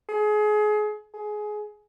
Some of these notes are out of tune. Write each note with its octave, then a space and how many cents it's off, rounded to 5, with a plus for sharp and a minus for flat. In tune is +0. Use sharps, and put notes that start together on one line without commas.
G#4 +30
G#4 +20